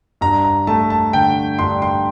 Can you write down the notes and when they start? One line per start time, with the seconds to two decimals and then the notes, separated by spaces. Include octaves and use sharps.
0.21 G2 A#5
0.44 A#5
0.67 A3 A5
0.90 A5
1.13 D3 G5
1.59 G2 C6
1.82 C6